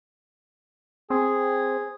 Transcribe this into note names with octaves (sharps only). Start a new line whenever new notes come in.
C4 G#4